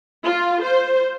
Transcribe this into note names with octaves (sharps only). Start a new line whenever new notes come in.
F4
C5